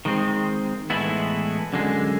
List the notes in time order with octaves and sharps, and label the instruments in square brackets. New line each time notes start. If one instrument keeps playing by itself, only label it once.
[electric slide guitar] D#3 G#3 C4
A2 E3 G#3 B3 E4
F#2 D3 G#3